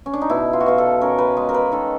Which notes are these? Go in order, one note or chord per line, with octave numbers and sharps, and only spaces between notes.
C#4
D4
D#4
B2 E4
F4
F#4
B2 F4
A4
C#4 A#4
B4
G#3
A#4
B4
D#3 A4